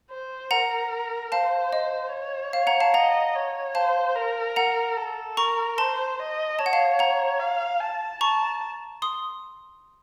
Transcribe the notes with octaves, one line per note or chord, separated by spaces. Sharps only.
C5
A#4 F#5 A#5
C5 F5 A5
D#5
C#5
F5
F#5 A#5
F5 A5
D#5 F#5 A#5
C#5
C5 F5 A5
A#4
F#5 A#5
A4
A#4 A#5 C#6
C5 A5 C6
D#5
C#5 A5
F#5
F5 A5
F#5 A#5
F5
A5
A5 A#5 C#6
C6 D#6